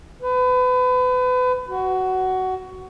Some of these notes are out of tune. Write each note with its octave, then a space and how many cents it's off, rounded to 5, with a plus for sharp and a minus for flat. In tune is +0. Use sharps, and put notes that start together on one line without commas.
B4 +30
F#4 +15